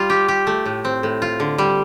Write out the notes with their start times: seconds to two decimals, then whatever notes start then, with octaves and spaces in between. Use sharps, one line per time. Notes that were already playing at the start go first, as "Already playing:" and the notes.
Already playing: G3 F4
0.10 G4
0.28 G4
0.47 A3
0.66 A2
0.85 C4
1.03 A2
1.22 F4
1.40 D3
1.58 G3